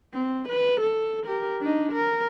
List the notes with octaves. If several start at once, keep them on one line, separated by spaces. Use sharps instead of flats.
C4
B4
A4
G4 A#4
D4 D#4
A#4